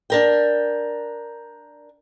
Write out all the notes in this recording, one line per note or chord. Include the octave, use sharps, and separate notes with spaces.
D4 A#4 G5